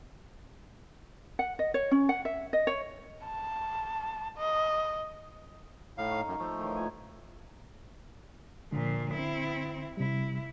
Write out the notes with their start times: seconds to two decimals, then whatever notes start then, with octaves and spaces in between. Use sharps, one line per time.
1.39 F#5
1.59 D#5
1.74 C#5
1.91 C#4
2.09 F#5
2.25 E5
2.53 D#5
2.67 C#5
3.25 A5
4.37 D#5
5.98 A2 D#4 F5
6.11 C#6
6.28 F#2
6.40 F3 A3 F5
6.58 A2 D#3 E3
6.77 A#2 G#5
8.72 A#2 D3 F3
9.13 C4 E4
9.97 C3 G3 E4